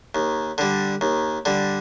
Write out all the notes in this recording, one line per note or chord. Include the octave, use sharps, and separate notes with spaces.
D#2
D3 G3
D#2
D3 G3